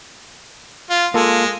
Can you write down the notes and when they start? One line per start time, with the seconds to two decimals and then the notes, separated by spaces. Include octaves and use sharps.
0.90 F4
1.14 G#3 A#3 F4 A4